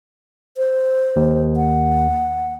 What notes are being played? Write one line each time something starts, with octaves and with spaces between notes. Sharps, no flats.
C5
D#2
F#5